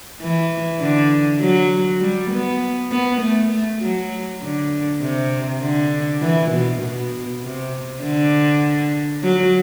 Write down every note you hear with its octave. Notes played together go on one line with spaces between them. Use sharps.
E3
D3
F#3
G3
B3
B3
A3
A3
F#3
D3
C3
D3
E3
B2
B2
C3
D3
F#3